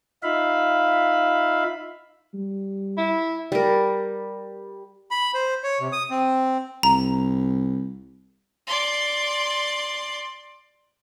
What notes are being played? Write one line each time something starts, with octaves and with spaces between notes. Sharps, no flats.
D#4 F4 E5 F5 B5
G3
E4
G3 A#4
B5
C5
C#5
C3
D#6
C4
C2 A#5
D5 C6